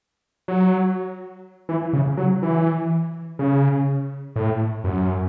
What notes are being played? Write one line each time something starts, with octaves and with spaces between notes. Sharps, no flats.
F#3
E3
C#3
F#3
E3
C#3
A2
F#2